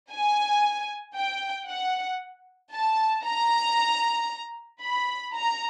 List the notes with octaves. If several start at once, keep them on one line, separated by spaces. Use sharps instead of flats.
G#5
G5
F#5
A5
A#5
B5
A#5